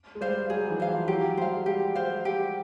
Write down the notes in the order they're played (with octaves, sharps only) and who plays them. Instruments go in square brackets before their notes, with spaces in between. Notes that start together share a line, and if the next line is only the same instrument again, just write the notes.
[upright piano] G#3
[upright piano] G3 [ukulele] C5 F5
[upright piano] F#3 [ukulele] G#4
[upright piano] E3
[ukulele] C5 F5
[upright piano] F3
[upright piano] F#3 [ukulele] G4
[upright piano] G3 [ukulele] C5 F5
[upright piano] G#3
[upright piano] G3 [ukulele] G4
[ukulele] C5 F5
G4